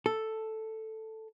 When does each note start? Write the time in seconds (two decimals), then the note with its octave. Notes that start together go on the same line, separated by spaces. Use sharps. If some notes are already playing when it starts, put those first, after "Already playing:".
0.06 A4